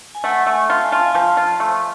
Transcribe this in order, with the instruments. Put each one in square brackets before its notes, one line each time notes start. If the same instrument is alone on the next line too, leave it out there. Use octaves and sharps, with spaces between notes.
[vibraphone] G#5
[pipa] A3 [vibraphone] F#5
[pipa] A3 [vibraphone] G#5
[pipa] F4 [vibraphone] A5
[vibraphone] G#5
[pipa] F4 [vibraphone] A5
[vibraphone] G#5
[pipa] F3 [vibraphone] A5
[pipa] F4
A3